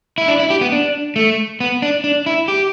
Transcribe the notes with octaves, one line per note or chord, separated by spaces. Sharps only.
E4
D4
E4
G4
B3
D4
A3
B3
D4
D4
E4
G4